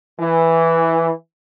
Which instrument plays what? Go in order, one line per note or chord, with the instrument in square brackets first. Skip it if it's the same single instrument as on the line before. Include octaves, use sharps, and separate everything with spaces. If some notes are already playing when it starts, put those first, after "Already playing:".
[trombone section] E3